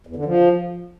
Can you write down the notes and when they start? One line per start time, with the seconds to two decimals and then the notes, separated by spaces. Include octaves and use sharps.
0.07 E2
0.16 D3
0.25 F3